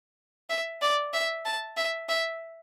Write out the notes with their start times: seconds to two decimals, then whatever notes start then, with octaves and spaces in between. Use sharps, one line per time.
0.50 E5
0.82 D5
1.13 E5
1.45 A5
1.77 E5
2.09 E5